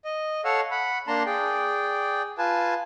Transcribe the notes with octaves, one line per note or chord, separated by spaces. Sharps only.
D#5
A4 C#5 F5 F#5 E6
F#5 B5
A#3 D4 A5 A#5 C6
G#4 D5 G5
F4 B4 G#5 A5